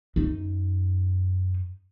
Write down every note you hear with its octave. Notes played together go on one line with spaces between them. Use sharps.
F#2 D#4